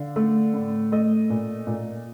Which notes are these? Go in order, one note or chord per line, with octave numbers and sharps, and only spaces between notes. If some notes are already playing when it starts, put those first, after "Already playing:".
Already playing: D3 F5
A3
A2
A3 D#5
A#2
A#2